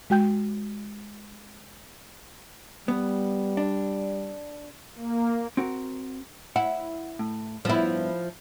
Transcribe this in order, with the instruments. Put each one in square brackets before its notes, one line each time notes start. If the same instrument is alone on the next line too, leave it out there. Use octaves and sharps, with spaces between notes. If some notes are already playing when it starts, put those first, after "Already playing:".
[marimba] G#3 F#4 G5 G6
[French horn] G3 [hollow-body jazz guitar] B3
[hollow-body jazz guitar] D4
[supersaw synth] A#3
[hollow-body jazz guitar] C4 F#4 A#4
[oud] E4 [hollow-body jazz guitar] F#5
[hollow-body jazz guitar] A2
[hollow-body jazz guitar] G2 B3 [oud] F3 E4